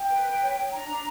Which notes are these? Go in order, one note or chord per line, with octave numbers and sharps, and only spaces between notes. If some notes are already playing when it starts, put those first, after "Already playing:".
Already playing: G5
B4
B4
C#5
C#5
D4 A#5
D4